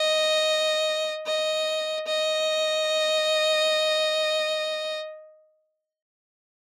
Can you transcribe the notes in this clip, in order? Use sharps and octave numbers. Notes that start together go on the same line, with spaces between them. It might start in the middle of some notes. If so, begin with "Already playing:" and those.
Already playing: D#5
D#5
D#5